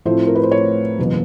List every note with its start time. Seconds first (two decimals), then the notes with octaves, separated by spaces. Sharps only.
0.05 A2 F3 A3 C4 E4 C5
0.27 A#4
0.35 B4
0.43 C5
0.51 C#5
0.98 F#1 E2 B2 F#3 A#3